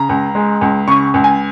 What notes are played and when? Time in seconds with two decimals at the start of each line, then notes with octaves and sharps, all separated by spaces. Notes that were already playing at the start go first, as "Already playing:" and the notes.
Already playing: C#3 A#5
0.09 C#2
0.35 G#3
0.61 C#2
0.88 C#3 C#6
1.14 C#2
1.24 G#5